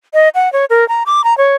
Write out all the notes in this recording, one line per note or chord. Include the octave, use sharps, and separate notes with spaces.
D#5
F#5
C#5
A#4
A#5
D6
A#5
C#5